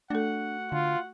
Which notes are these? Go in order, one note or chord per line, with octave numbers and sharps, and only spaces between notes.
A3 D4 F#4 A4 F#5
D3 F4